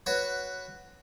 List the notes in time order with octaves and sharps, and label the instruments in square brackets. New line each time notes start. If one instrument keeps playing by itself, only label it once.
[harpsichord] F#4 B4 C#5